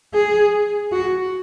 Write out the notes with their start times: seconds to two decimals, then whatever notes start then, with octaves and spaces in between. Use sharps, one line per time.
0.14 G#4
0.92 F#4